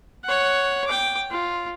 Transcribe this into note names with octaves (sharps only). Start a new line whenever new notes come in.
C#5 F#5
G5 D6
F4